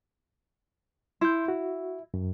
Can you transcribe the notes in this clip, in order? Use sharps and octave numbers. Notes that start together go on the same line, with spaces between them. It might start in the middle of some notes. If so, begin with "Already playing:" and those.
E4 C6 G6
F#4
F#2